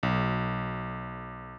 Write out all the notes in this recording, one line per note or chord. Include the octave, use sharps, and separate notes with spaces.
B1